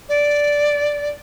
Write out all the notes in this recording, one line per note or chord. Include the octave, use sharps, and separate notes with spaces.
D5